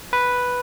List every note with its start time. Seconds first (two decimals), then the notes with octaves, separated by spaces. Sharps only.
0.13 B4